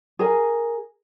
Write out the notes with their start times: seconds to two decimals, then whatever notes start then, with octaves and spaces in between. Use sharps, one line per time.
0.19 G#4 A#4 G#5